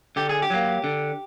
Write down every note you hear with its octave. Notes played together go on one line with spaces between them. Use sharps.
D3 G4
G#4
G4
F#3 A#3
D3